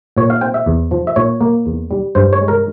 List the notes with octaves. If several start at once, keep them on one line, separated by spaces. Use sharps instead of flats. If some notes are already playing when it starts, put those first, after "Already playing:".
A#2 C#5
F5
C4 G5
E5
E2
F3
E5
A#2 C#5
A#3
E2
G3
G2 C5
C#5
G#3
A#4